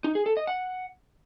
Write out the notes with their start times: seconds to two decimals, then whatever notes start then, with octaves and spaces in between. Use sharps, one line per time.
0.04 D#4
0.15 G#4
0.26 A4
0.37 D#5
0.47 F#5